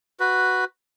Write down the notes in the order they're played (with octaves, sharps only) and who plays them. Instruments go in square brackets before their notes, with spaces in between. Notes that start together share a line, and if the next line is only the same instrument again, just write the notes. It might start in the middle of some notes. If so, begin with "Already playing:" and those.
[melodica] F#4 B4